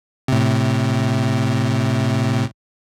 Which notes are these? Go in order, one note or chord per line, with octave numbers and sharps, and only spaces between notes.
A2 C3